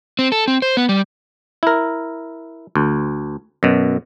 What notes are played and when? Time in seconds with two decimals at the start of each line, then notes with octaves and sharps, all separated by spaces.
0.19 C4
0.32 A4
0.48 C4
0.62 C5
0.77 B3
0.89 G3
1.63 E4 A#4
2.76 D2
3.63 F#2 B2